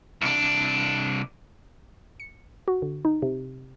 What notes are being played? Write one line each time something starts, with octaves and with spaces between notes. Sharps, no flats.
C2 D4
C#7
F#4
D3
D#4
C3